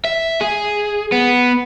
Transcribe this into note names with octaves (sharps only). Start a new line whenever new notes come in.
E5
G#4
B3